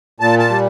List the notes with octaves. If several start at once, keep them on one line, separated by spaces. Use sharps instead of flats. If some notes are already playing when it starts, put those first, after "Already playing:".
A#2 A5
A5
G3